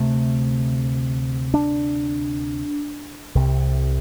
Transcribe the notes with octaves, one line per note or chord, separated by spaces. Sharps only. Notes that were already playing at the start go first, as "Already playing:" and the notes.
Already playing: D2 C3 A3
D4
C2 C3